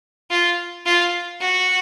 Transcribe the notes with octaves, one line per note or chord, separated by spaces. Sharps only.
F4
F4
F#4